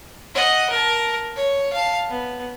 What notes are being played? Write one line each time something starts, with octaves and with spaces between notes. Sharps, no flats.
D#5 F#5
A#4 A5
C#5
F5 A5
B3